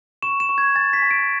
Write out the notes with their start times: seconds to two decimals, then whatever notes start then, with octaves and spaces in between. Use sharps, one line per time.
0.22 C#6 E7
0.40 E7
0.49 C#6
0.58 G#6
0.75 G#5 A6
0.93 B6
1.02 G#5
1.11 D7